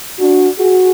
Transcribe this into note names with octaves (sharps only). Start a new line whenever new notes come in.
D4 F#4
F#4 G#4